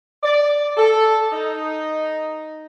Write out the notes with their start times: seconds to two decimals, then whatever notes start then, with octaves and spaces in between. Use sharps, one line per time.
0.23 D5
0.77 A4
1.33 D#4